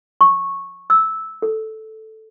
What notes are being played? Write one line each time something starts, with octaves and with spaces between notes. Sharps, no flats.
C#6
E6
A4